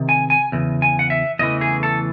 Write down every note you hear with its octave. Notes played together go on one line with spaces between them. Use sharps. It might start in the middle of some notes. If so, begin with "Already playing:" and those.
Already playing: C3 D#3
G#5
G#5
E2 C#3
G#5
F#5
E5
E2 C#3 E3 A3 D#5
G#4
A4